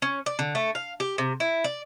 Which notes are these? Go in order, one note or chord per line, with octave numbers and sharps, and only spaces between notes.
C#4
D5
D3
A3
F5
G4
C3
E4
D5